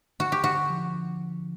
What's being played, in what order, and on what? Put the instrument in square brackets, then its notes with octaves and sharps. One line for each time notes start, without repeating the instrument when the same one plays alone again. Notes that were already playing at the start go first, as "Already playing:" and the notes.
[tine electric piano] D3 [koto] F#4
[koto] G4
[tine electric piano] D3 [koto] F#4
[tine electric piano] F3